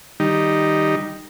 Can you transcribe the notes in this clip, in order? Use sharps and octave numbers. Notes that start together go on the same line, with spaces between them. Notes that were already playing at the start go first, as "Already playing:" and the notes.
D#3 G3 D#4